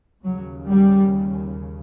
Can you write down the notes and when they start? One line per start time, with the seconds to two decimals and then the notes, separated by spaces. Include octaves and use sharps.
0.23 D#2 C#3 F#3
0.69 G3